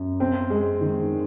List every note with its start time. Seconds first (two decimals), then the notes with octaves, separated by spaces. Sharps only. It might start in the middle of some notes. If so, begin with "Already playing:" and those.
Already playing: F#2
0.20 C4
0.50 G#3
0.81 D#3